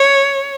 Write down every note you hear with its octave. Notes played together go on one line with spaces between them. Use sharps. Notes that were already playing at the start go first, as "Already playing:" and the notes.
Already playing: C#5